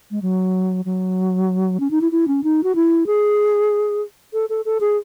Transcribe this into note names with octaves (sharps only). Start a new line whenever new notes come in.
G#3
F#3
F#3
C#4
D#4
E4
E4
C#4
D#4
F#4
E4
G#4
A4
A4
A4
G#4